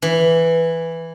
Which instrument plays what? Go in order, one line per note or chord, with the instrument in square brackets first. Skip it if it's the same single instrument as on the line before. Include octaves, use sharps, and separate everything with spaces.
[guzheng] E3